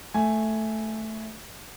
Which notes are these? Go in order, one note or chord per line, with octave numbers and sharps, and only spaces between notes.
A3 G#5